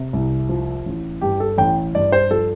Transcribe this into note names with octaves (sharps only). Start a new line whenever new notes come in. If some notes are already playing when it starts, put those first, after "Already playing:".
Already playing: C3
C2
F3
A1
G2 G4
A4
A1 G5
G2 D5
C5
F3 A4